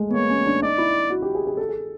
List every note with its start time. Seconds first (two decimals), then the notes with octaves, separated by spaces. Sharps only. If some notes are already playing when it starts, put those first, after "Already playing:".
Already playing: G#3 A3
0.10 B3
0.13 A#3 C#5
0.30 C#4
0.46 D4
0.62 D#4 D5
0.78 E4
1.10 F#4
1.22 G4
1.35 G#4
1.47 G#4
1.57 A4
1.69 G#4